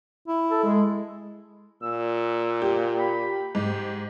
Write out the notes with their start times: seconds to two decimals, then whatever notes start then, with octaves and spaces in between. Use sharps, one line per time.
0.28 E4
0.51 A4
0.64 G#3
1.83 A#2 E6
2.62 G4
2.99 B5
3.55 G#2 G4